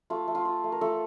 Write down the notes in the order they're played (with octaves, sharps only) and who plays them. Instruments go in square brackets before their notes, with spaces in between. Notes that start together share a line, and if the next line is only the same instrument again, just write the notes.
[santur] A3 F4
A3
F4
F4
A3
A#4
A3 F4 A4